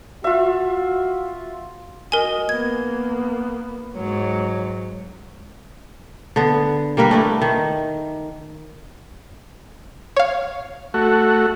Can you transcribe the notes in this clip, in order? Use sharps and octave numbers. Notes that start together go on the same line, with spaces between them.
F4 F#4 E5
F#4 A#4 D#5 G#5
A#3 B3 G#6
G#2 F#3 C#5
D3 B3
G3 A#3 A#4 B4
A3 D4 E4
D#3
C#5 F5
A3 F#4